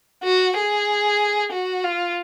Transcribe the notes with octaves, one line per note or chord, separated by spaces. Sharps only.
F#4
G#4
F#4
F4